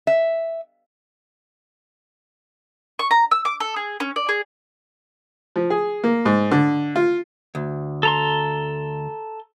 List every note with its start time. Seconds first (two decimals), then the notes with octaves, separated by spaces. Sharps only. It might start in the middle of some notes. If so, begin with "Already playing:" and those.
0.07 E5
2.99 C#6
3.11 A#5
3.31 E6
3.45 D6
3.60 A4
3.76 G#4
4.00 C#4
4.16 D5
4.29 G#4
5.56 F3
5.70 G#4
6.04 A#3
6.25 G#2
6.51 D3
6.96 F4
7.55 D2
8.03 A4 A#5 C6